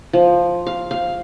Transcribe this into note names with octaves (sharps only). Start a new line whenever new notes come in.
F3
F5
F5